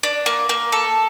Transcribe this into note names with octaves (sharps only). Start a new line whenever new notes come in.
D4
A#3
A#3
A4